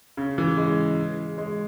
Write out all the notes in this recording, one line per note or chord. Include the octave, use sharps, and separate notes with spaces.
C#3
E3
G#3
G#3